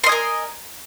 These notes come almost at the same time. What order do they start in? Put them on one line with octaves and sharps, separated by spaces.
C6 D#5 G#5 A#4